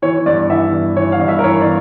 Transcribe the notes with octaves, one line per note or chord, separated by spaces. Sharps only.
E3 C#5
G2 D5
E3 E5
G2
E3 C#5
F5
G2
E5
A#4
E3 C#5
D5